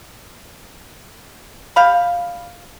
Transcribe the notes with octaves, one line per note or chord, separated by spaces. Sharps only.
G3 F5 B5